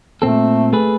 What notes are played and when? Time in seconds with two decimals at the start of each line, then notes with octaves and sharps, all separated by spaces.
0.22 A#2 A3 C4 A4
0.73 A3 G#4 B4